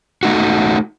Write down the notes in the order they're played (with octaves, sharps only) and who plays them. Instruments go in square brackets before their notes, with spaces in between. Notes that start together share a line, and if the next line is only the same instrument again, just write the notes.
[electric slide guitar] A3 D#4 F#4